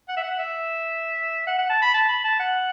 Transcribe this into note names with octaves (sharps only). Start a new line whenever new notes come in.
F#5
E5
F#5
E5
F#5
F#5
A5
B5
A5
B5
A5
F#5